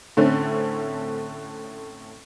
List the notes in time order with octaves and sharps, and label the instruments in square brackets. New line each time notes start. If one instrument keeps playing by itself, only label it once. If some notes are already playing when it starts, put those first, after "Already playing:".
[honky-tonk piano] A2 D3 A3 C4 C#4